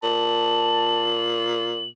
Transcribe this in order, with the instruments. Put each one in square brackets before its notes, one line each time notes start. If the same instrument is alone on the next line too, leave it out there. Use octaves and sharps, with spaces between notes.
[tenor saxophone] A#2 [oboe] A5 [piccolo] F#7